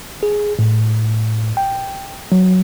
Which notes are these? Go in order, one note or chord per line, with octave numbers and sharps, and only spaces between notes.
G#4
A2
G5
F#3